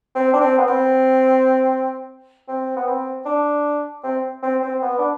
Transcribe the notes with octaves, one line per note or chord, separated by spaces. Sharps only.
C4
D4
C4
B3
C4
C4
B3
C4
D4
C4
C4
C4
B3
D4